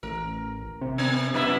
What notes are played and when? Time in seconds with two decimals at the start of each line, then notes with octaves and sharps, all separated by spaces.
0.03 A1 A#4
0.81 C3
0.98 B3
1.34 F#2 B3 E4 E5